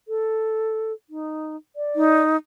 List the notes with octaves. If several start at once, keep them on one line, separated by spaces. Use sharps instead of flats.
A4
D#4
D5
D#4